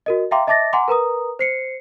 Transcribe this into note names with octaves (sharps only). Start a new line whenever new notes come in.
F#4 A#4 D#5
E5 F5 G5 A#5 C6 D6
D#5 E5 A5 D6 A6 A#6
F#5 G#5 A#5 C6 D6
A#4 B4 A#5 D#6
C5 C7 C#7